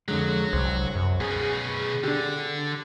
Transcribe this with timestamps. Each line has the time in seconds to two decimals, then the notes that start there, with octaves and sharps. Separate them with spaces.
0.08 F2 D3 F#3 G#3
0.53 C2 C5
0.95 F#2
1.21 B2 C#4 G#4
2.04 D3 D4 G4